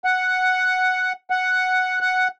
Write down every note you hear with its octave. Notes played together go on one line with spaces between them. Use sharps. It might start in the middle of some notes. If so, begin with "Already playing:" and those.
F#5
F#5
F#5